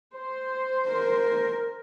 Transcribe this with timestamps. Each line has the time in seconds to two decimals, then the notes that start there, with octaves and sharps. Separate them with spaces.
0.15 C5
0.90 A#4